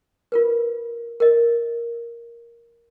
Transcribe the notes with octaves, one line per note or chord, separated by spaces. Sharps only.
F4 A#4 B4
A#4 D#5